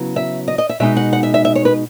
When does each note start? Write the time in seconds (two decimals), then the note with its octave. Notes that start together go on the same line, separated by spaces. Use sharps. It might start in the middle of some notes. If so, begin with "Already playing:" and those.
Already playing: C#3 F#3 B3 E4
0.16 E5
0.48 D#5
0.58 D#5
0.69 E5
0.80 B2 G#3 D#4 E5
0.97 F#5
1.13 F#5
1.23 E5
1.34 E5
1.45 E5
1.55 C#5
1.65 B4